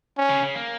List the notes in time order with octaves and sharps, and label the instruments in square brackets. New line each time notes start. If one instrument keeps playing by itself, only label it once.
[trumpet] C#4
[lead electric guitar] C#3
C#3
A#3